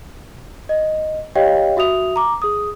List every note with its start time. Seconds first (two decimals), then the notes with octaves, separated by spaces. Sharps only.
0.69 D#5
1.35 G4 C#5 D#5 F5 G5
1.77 F#4 E5 D#6 F7
2.16 A#5 D6
2.42 G#4 D#6